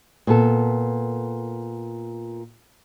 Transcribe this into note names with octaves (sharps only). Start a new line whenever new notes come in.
A#2 B3 A4